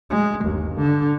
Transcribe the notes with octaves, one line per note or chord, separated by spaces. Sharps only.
G#3
G1 D#2
D3